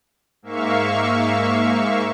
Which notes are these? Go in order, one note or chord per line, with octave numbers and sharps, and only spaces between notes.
G#2 A#3 E5 F5 C#6